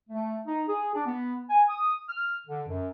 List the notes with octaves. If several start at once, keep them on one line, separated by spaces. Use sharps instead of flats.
A3
D#4
G#4
D4
B3
G#5
D#6
F6
D3
F#2